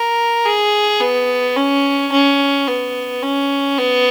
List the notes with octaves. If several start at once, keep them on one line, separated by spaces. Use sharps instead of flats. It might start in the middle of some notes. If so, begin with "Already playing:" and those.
Already playing: A#4
G#4
B3
C#4
C#4
B3
C#4
B3